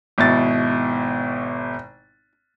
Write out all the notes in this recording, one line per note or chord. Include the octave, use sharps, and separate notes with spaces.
G#1 B2 E4 A6